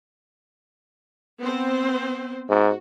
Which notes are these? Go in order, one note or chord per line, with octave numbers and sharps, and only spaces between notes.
B3 C4 C5
G#2 F#4